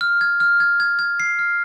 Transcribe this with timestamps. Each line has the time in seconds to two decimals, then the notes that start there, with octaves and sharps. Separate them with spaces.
0.01 F6
0.21 G#6
0.40 F6
0.60 G#6
0.80 G#6
0.99 G#6
1.20 C7
1.39 F6